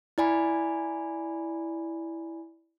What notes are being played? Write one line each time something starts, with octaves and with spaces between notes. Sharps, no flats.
E4 D5 G#5 B5